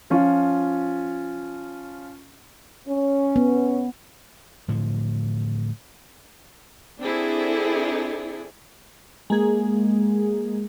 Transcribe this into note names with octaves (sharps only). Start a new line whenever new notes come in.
F3 C#4 F4
C#4
B3
A2 D3 F3
C4 D4 E4 G#4 A4
G#3 A#3 G#4